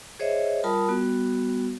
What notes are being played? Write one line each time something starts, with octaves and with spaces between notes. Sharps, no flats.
G#4 C5 C#5 D#5 E5
G3 F4 A#4 A5 B5 D#6
G3 B3 F#4